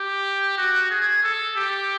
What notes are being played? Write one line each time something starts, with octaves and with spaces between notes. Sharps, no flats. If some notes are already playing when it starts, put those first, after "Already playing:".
Already playing: G4
F#4
G#4
A4
G4